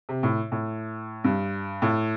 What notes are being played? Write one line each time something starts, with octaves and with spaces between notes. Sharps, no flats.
C3
A2
A2
G2
A2